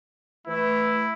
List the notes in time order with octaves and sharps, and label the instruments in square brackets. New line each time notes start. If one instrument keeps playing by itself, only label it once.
[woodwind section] E3 A3 [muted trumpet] E4